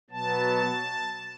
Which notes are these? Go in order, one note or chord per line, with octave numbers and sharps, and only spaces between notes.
B2 F#3 B3 A5